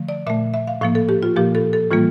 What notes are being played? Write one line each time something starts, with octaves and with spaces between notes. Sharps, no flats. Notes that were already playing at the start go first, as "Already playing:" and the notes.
Already playing: D3 F3 A3
D5
A#2 A3 E5
E5
F5
A2 F3 A#3 F5
A4
G4
F4
A#2 F3 A#3 G4
A4
A4
A2 E3 G3 A#3 F4